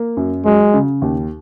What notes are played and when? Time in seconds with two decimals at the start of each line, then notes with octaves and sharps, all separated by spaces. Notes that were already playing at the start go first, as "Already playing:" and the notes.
Already playing: A#3
0.17 F#2
0.45 F#3 G#3
0.74 C#3
1.02 D#2